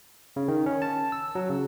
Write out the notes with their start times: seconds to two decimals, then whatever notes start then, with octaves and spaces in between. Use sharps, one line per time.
0.36 C#3
0.48 D#3
0.66 C#4
0.82 A5
1.12 E6
1.35 F#3
1.50 C#3